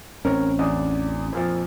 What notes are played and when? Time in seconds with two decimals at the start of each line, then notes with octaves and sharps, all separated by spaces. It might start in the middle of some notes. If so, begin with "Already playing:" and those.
0.25 A1 C4 C#4 A#4 C#5
0.59 E2 D4 D#6
1.33 F2 A#2 F3